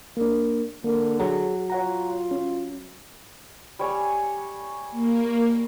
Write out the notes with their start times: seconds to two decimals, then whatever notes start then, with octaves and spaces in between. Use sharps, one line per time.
0.17 A#3 D4
0.84 D3 A#3
1.19 F#3 G#4
1.70 F4 C#5 F#5 A#5
2.31 C#4
3.79 G3 C#5 G#5
4.91 A#3